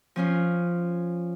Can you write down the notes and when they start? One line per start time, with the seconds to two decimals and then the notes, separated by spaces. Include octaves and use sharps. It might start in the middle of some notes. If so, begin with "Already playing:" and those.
0.16 F3 C#4 F4